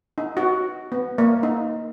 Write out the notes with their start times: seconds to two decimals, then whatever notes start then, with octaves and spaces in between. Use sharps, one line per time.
0.18 D#4
0.37 F#4
0.92 B3
1.18 A#3
1.43 D#4